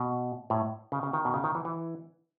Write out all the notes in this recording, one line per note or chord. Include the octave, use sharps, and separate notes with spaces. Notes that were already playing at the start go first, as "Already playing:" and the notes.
Already playing: B2
A2
C#3
C#3
D#3
B2
C#3
D#3
E3
E3